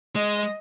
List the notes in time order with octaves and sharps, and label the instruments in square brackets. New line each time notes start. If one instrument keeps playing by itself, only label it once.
[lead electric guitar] G#3 [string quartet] D#5